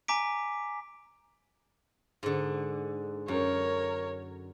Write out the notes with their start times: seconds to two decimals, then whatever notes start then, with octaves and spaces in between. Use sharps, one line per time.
0.08 G#5 A#5 D6 B6 D7
2.23 G#2 D3
3.28 F#2 A#4 C#5